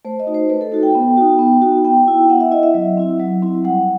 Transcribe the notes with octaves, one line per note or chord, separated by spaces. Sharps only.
A3 C5
D#5
D#4 F#4
C5
A3 B4
A4
D#4 F#4 A4
G5
B3
D#4 F#4
B3
D#4 F#4
B3 G5
E4
B3 F#5
E5
E4 D#5
E5
F#3
C4 E4
F#3
C4 E4
G3 F#5